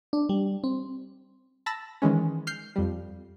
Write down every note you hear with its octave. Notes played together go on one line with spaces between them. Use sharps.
D4
G3
C4
A5 B5 E6 A6 A#6
D#3 E3 G#3 C#4
F6 G6 C7
F2 G3